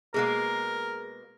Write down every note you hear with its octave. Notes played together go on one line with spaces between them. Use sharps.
B2 G#3 A#3 G#4 A#4